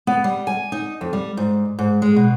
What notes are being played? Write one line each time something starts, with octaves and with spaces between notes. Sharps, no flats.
B3
G3
G#5
D#4
F2
G3
G#2
G#2
G#3
B2